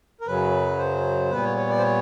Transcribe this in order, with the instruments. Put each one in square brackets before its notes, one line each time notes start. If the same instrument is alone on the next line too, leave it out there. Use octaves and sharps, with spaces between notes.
[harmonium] A#4
F#2 C#3 F#3 B4
C5
A#2 G3 B3 B4
C#5
C#5
D5
C5
C#5